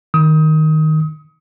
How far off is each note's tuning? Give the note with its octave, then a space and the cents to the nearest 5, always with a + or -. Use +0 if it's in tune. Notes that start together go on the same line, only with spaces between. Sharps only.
D#3 +0 D#6 +30